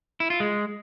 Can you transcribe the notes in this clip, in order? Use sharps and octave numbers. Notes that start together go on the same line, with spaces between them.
E4
F4
G#3